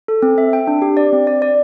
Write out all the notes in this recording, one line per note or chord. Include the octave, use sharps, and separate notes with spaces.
A4
C4
E5
G5
D4
G4
D5
C4
D5
D5